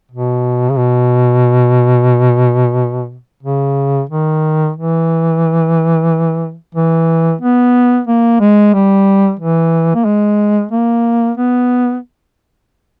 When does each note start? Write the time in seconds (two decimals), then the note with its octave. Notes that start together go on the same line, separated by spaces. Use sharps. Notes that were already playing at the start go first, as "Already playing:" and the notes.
0.11 B2
0.71 C#3
0.78 B2
3.43 C#3
4.09 D#3
4.76 E3
6.74 E3
7.41 B3
8.07 A#3
8.40 G#3
8.74 G3
9.39 E3
9.95 A#3
10.05 G#3
10.72 A#3
11.37 B3